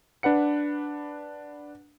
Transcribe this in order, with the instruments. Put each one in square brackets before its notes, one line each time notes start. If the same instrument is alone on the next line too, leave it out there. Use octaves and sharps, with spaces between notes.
[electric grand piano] D4 B4 F#5 C#7